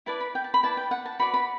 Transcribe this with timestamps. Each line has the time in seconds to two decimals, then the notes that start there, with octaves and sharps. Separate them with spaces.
0.06 E4 B4 D5 A5
0.20 B5
0.35 G5
0.44 A5
0.54 B5
0.63 E4 B4 D5 A5
0.77 G5
0.91 F#5
1.06 A5
1.19 F#4 B4 D5 B5
1.34 B5